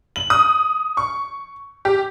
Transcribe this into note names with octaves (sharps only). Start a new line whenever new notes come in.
F#7
D#6
C#6
G4